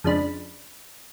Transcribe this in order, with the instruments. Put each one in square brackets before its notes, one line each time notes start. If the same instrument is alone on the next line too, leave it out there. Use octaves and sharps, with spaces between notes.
[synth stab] F2 C#3 F3 G#3 D4 B5